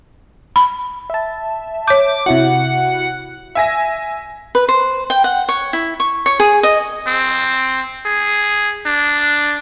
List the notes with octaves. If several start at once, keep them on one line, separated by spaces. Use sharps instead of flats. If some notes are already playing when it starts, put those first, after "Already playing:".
B5
E5 A5
C#5 D6 G6
C3 E4 F#4 F#5
E5 G#5 A#6
B4
C5
G5
F#5
C#5
E4
C#6
C#5
G#4
D#5
C4
G#4
D4